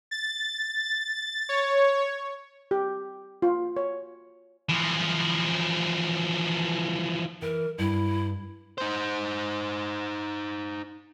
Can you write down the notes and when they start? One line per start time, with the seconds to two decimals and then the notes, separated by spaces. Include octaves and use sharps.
0.11 A6
1.49 C#5
2.71 G4
3.42 F4
3.77 C#5
4.69 E3 F3
7.42 E3 A#4
7.78 G2 E4
8.78 D#4 C5